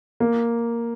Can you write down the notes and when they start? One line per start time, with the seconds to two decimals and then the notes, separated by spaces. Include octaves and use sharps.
0.20 A#3